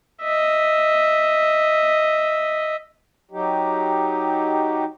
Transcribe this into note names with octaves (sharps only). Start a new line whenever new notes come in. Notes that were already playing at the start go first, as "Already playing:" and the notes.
D#5 E5
F#3 D#4 G4